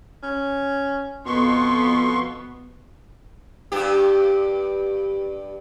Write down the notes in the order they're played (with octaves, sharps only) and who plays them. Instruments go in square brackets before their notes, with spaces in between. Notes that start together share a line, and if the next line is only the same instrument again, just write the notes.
[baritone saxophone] C#4
[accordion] F2 C6 C#6 [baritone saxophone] B2 [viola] B3
[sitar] G2 G4